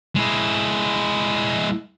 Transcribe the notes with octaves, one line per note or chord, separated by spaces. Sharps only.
G#3 E4